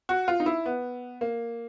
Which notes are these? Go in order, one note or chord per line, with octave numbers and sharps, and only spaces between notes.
F#4
F4
D#4
E4
B3
A#3